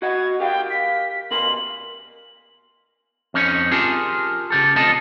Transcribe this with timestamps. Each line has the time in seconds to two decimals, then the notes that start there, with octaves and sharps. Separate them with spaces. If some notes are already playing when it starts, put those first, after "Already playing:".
0.02 F#4 D#5 F#5 G#6
0.40 G4 A#4 F5 G5
0.70 B6
1.31 B2 A#4 C6 F#7
3.34 F2 C#4 D#4 G4 C#5
3.71 F4 G4 G#4 A#4 A5
4.50 C#3 G4 A4
4.76 D2 C3 F4 A4 D#5 A5